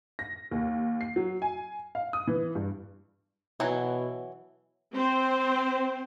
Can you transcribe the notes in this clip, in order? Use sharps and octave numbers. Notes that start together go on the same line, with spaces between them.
A#6
D#2
C7
F#3
G#5
F5
D#6
E3
G2
B2 E3 F#3 E4
C4 C5